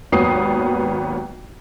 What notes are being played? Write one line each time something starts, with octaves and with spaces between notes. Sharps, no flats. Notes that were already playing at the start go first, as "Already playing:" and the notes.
G#1 D#2 F#3 B3 D#6 C7